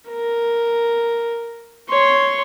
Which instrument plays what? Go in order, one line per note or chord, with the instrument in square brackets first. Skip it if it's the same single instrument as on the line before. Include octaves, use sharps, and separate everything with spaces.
[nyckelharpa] A#4
C#5 C6